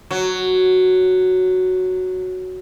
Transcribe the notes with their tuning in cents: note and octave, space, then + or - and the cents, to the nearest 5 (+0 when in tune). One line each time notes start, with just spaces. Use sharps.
F#3 +0